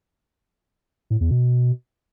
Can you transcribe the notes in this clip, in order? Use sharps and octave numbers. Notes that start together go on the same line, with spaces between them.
A2
E2
B2